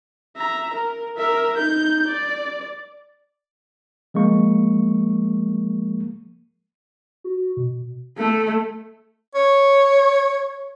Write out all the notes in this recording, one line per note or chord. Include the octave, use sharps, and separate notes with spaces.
E5 A#5
A#4
A#4 E5
D#4 G6
D5
F3 G#3 A#3 C#6
F#4
B2
A3
C#5